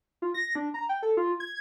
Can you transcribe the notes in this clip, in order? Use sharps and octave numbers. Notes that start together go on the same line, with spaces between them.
F4
A#6
D4
A#5
G5
A4
F4
G#6